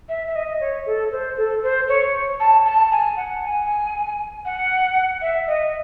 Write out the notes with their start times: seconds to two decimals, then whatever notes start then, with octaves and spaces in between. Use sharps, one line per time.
0.09 E5
0.27 E5
0.35 D#5
0.60 C#5
0.86 A4
1.12 C5
1.37 A4
1.63 C5
1.88 C#5
2.40 A5
2.65 A5
2.92 G#5
3.17 F#5
3.42 G#5
4.45 F#5
5.22 E5
5.47 D#5